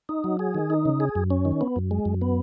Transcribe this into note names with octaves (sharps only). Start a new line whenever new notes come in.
D#4
F#3
G#4
D#3
D#4
C#3
G#4
F#2
C#4
D#3
B3
F#2
G#3
F#2
B3